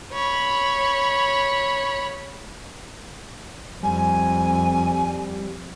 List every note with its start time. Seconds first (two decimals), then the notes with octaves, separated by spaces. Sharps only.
0.12 C#5 B5
3.83 F2 G3 G#5